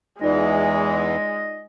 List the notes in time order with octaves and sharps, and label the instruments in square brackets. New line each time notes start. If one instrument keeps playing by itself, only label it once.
[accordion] E2 E3 [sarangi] G#3 [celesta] D#4 F4 D5 [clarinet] D#5